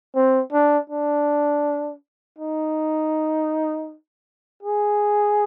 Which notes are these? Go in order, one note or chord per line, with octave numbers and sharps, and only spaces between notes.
C4
D4
D4
D#4
G#4